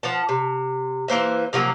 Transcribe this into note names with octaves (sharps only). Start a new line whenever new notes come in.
F3 F#5 A5
C3
E3 A#3 C5 E5
C3 F3 F#3 A#3